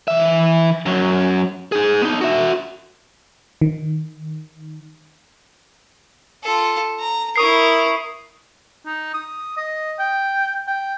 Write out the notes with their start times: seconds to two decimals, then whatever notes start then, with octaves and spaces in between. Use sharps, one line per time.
0.08 E3 E5
0.86 F#2 F#3
1.72 D#4 G#4
2.02 B3 D#4
2.21 F#4 E5
3.61 D#3
6.44 F4 A4
6.99 A#5
7.36 E4 A#4 C#6 D#6 C7
8.86 D#4
9.14 D#6
9.57 D#5
9.99 G5
10.68 G5